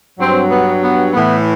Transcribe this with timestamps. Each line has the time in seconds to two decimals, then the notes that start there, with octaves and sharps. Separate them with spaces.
0.19 G2 F#3 C4
0.50 B3
0.82 B3
1.13 A2 E3 B3